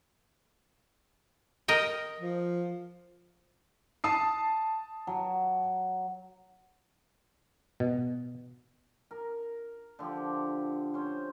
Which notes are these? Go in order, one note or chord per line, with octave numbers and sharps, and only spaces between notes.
A#4 D#5 G5
F3
A5 D#6 C7
F#3
B2
A#4
D3 F3 G4
C#4 C5